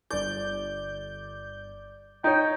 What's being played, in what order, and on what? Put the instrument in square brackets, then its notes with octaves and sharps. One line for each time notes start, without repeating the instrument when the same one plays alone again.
[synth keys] G1 G6 [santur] D5
[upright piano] D#4 C#5 [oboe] G5